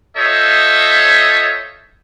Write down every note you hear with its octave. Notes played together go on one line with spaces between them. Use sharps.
F4 A4 C5 C#5 D#5 E5